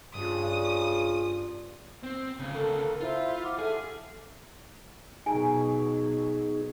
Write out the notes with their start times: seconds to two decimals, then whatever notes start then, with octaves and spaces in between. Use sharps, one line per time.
0.15 G2 C#3 F4 D#6
2.03 C4
2.39 D2 C#3
2.54 A4 A#4
3.00 E4 F4 C5
3.43 F#5 D6 F6
3.59 G#4 A4 E5 F6
5.26 B2 F#3 D#4 G#4 G#5 A#5